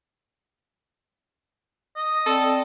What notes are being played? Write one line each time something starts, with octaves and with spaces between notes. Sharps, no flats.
D#5
C4 A4 D5 G5